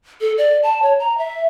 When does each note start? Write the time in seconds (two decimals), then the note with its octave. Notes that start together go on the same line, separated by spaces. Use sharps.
0.21 A4
0.38 D5
0.63 A5
0.82 C#5
0.99 A#5
1.18 E5